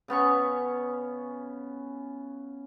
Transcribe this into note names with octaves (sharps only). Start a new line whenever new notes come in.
C#3 B3 C#4 C#6